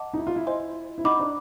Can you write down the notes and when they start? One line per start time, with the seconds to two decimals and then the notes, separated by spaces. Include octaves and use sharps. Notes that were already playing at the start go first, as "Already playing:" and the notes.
Already playing: D#5 F#5 A5 D6
0.13 D#4
0.18 E4
0.27 F4
0.36 E4
0.47 C5 D#5 G#5 C6
0.98 E4
1.04 D#4 D#5 F#5 B5 D6
1.19 D4